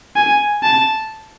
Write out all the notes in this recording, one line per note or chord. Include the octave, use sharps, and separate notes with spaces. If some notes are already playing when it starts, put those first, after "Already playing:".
G#5
A5